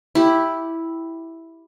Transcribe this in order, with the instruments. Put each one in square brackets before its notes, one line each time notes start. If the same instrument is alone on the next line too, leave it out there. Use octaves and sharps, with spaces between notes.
[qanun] E4 G4